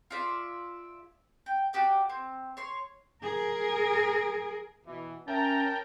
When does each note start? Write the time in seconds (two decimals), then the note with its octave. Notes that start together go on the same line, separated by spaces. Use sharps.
0.11 F4 G#4 D5 E5
1.46 G5
1.73 F#4 G4 D5 G5
2.09 C4
2.57 C#5 C6
3.22 G#4 A#4
4.85 B2 E3
5.28 C#4 A#4 E5 G5 A5 A#5